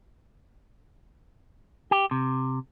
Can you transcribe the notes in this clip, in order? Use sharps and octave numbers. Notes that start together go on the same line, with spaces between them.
G4
C3